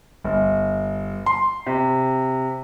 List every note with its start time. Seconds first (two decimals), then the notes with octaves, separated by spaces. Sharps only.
0.24 G1
1.26 C6
1.67 C3